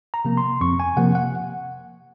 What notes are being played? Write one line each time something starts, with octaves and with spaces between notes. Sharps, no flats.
A#5
C3 F3 A#3
C6
F2 C#6
G#5
C3 F3 A#3 F#5
F#5